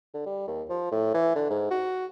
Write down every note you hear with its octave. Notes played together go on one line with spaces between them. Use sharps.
D3
G3
D#2
F3
A2
E3
D3
G#2
F#4